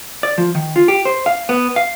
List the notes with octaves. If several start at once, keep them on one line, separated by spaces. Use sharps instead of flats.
D5
F3
D#3
F4
G4
C5
F5
B3
F5